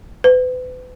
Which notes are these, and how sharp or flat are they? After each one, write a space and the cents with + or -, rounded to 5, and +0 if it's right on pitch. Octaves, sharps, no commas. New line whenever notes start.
B4 +35